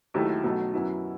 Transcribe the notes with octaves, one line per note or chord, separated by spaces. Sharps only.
D#2 D#3 F#3 A3 E4
B1 B2 F#3 A3
F#2 F#3 B3 E4